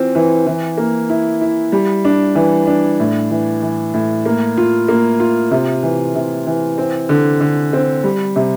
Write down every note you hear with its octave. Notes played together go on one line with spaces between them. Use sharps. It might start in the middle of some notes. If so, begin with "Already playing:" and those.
Already playing: E3 C4 F4
E3
E3
A#3
E4
E4
G3
D4
E3
D4
A2
E3
E3
A2
A#3
F4
A#3
F4
C3
E3
C3
E3
C4
D3
D3
C4
G3
C3